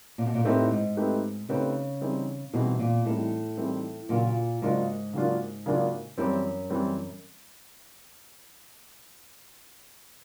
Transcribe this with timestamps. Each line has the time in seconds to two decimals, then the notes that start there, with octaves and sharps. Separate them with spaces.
0.18 A#2
0.26 B2
0.34 A#2
0.44 A2 A3 C4 D#4 G4 B4
0.71 G#2
0.97 A3 C4 D#4 G4 B4
1.49 C#3 A3 C4 D#4 G4 B4
2.01 E3 G3 C4 D#4 G#4
2.54 B2 E3 G3 C4 D#4 G#4
2.79 A#2
3.05 A2 E3 G3 C4 D#4 G#4
3.57 E3 G3 C4 D#4 G#4
4.09 A#2 C#3 F#3 A#3 D4 F4
4.62 G#2 C#3 F#3 A#3 D4 F4
5.13 C#3 F#3 A#3 D4 F4
5.66 C#3 F#3 A#3 D4 F4
6.17 F#2 E3 G3 C4
6.70 E3 G3 C4